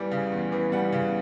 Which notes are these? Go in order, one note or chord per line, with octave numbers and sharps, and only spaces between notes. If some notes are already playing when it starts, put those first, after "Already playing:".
Already playing: E2 E3 G3 F#5
C#3
E2
E3
G3 F#5
C#3